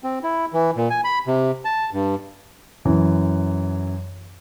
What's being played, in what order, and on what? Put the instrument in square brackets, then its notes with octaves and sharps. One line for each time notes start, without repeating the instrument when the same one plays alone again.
[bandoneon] C4
E4
E3
A#2
G#5
B5
C3
A5
G2
[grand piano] F#2 E3